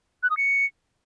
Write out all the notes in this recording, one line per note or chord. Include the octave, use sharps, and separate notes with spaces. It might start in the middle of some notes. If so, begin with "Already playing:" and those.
F#6
D#6
C#7